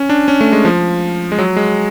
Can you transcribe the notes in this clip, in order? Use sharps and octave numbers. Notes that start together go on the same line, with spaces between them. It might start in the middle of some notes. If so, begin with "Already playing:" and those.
Already playing: C#4
D4
C#4
A3
G#3
F3
G#3
F#3
G#3